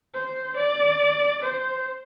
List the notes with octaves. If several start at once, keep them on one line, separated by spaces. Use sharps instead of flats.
C5
D5
C5